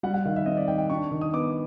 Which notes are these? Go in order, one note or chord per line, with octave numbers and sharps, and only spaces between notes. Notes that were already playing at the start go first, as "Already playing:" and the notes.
G3 F#5
F#5
D#3 F5
E5
C4 D#5
D5
D#3 G5
G5
D4 C#6
D#3
D#6
B3 D6